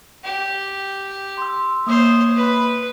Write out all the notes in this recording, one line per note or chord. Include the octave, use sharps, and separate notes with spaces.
G4
C6 E6
A#3 C5 C#5 D#6
B4